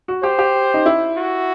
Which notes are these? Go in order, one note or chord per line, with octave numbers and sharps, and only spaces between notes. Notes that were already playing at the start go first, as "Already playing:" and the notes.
F#4
G4 C5
G4
D#4
E4
F#4